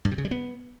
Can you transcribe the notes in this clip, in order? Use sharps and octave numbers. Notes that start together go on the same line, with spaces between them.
G2
C3
C#3
G3
B3